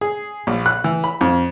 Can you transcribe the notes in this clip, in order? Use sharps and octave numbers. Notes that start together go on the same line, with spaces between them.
G#4
A#1
F#6
E3
B5
F2